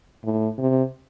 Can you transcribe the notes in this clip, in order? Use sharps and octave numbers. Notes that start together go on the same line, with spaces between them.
A2
C3